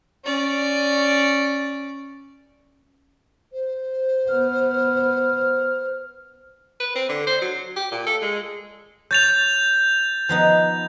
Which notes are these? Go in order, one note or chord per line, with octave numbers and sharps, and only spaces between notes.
C#4 D5
C5
B3 F6
B4
C4
D3
C5
F#3
G4
A#2
A4
G#3
C#5 G6 A6 F7
F3 B3 D#4